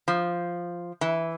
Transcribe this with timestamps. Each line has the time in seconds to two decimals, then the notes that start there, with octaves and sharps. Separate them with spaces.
0.08 F3
1.01 E3